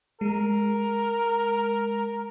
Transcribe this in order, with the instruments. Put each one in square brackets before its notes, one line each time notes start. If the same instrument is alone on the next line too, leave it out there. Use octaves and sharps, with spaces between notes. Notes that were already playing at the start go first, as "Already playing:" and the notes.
[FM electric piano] G#3 [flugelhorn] A#4